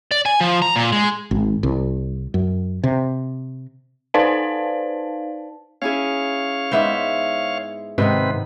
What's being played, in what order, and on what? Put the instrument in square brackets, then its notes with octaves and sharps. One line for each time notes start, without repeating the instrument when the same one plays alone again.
[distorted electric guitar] D5
G#5
F3
A#5
A#2
G#3
[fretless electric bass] G#1
C2
F#2
C3
[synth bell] D#4 B4 C5 D5 F5 A5
[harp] C#4 E4 G#4 [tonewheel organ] C#5 F5
[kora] G#2 B3 C5 [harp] E5 C6
[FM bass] G#2 [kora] C3 D#3 B3 [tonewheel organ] C4 B4